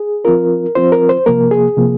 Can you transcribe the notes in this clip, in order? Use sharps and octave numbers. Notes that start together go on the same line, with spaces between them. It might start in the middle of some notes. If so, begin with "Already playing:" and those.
Already playing: G#4
F3 C4 F4 A#4
F3 C4 F4 C5
A#4
C5
C3 F3 A#3 A#4
G#4
C3 F3 A#3